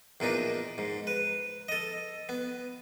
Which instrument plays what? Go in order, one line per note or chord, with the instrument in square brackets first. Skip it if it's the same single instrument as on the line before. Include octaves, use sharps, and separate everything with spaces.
[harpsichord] E2 A#2 D4 D#4
G#2
B4
A4 D#5
B3